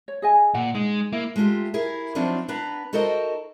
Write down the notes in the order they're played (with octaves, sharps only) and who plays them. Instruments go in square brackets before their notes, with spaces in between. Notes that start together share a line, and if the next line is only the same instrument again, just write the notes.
[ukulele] C#5
G#4 D#5 G#5
[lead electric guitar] A#2 [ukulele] F#5
[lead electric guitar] G#3 [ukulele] D#4
[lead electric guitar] A#3 [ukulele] E4
[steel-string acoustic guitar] G#3 A3 D#4 F4 G4
E4 G#4 A#4
F3 F#3 C4 D4 D#4 F4
B3 D4 B4 A#5
D#4 F#4 A4 A#4 C5 D#5